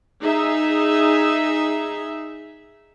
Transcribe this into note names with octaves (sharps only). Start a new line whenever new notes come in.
D#4 G#4 E5